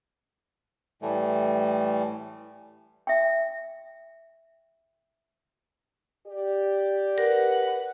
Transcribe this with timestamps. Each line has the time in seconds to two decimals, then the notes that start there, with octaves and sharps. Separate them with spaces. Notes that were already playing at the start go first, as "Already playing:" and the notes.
1.02 A2 E3 G3 A3
3.07 E5 G5
6.27 G4 D5
7.18 A#4 B4 F#5